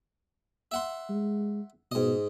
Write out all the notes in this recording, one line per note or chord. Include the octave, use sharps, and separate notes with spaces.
E5 F#5 C6
G#3
G#2 B2 D#5